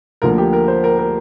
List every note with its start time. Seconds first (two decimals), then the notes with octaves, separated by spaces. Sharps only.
0.22 D2 D3 F3 A#3 A#4
0.38 G4
0.53 A#4
0.68 C5
0.84 A#4
0.99 A#4